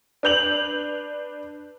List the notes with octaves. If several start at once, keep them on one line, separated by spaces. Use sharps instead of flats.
D4 B4 G6 F7 F#7